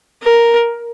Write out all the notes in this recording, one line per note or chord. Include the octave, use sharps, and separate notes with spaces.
A#4